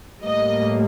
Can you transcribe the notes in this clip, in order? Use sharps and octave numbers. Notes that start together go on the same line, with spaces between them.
A2 G3 A#3 D#5